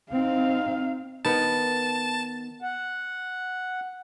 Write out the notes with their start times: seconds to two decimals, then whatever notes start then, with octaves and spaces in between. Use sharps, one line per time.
0.11 C4 D#4 F5
1.25 D#3 B3 A5
2.62 F#5